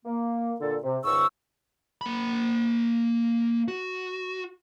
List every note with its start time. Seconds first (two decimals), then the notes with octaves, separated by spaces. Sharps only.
0.05 A#3
0.61 A#2 D3 A4
0.83 C3
1.04 C#2 G#2 D#3 C#6 E6
2.01 A#3 B5
3.68 F#4